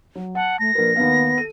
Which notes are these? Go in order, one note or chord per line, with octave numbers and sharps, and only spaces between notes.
F#3
F#5 A5
A3 A#6
A#1 A#4 B4
D#2 B3 F5
A4 D#7